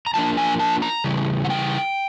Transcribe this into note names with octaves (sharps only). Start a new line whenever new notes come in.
A#5
F3 A#3 D4 A5
G#5
A5
A#5
C#3 E3 G3
F#5
G5